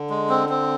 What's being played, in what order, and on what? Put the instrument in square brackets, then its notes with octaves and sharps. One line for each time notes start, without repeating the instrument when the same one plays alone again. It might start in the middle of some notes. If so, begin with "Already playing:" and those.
Already playing: [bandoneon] D3
[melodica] G#3
C4
C4